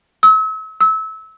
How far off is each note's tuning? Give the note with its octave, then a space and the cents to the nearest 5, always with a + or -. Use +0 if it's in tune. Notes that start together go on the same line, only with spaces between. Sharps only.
E6 -40
E6 -25